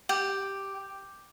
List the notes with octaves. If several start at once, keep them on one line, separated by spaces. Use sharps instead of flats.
G4